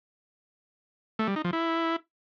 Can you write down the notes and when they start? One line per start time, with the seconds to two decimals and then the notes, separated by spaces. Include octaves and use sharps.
1.19 A3
1.28 G3
1.36 D#4
1.45 F3
1.53 E4